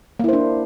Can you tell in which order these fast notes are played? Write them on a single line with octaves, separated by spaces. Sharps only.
A#3 E4 C5 D4